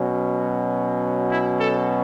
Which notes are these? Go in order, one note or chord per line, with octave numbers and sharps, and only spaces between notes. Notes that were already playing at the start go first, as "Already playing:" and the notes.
Already playing: B2 F#3 C#4
E4
A4